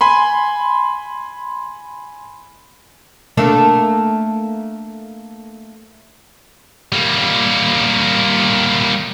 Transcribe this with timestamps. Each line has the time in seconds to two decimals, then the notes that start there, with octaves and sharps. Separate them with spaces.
0.01 G#5 B5 C6
3.37 A3 A#3 D4
6.93 G3 A#3